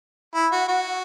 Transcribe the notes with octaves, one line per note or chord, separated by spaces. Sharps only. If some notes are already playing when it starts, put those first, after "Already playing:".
E4
F#4
F#4